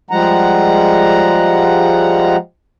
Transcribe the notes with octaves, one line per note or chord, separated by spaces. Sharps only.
F3 G3 G#3 F#5 A#5